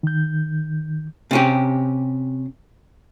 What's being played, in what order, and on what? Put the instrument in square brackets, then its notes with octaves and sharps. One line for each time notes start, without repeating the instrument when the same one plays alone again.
[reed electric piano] D#3 G6
[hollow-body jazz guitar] C3 C#4 G4